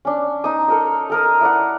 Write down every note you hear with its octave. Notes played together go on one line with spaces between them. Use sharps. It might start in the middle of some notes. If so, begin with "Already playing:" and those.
C#4 D4
D#4 D#6
A4 A#4 D#5
A4 A#4 D#6
E4 D5 F#5